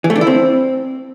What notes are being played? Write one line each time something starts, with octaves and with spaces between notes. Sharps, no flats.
E3
A3
D4
E4
C4